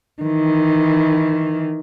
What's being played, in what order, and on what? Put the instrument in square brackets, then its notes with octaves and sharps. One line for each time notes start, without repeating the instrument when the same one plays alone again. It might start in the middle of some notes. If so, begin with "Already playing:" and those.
[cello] D#3 E3